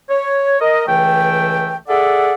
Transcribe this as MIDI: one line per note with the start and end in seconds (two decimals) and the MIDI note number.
0.09 0.57 73
0.60 0.83 70
0.60 0.83 75
0.87 1.75 37
0.87 1.75 52
0.87 1.75 57
0.87 1.75 79
1.88 2.34 68
1.88 2.34 69
1.88 2.34 74
1.88 2.34 76
1.88 2.34 78